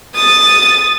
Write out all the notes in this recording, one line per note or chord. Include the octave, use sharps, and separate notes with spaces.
D#6 A6